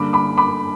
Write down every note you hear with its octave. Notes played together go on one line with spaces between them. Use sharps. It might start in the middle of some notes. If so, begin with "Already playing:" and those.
Already playing: G2 D3 A#3 B5 D6
B5 D6
B5 D6